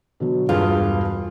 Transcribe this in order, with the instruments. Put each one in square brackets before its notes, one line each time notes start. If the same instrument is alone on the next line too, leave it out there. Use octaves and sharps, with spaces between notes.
[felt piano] B2 D3 F#3
[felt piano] E1 G2 G#4 [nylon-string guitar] F4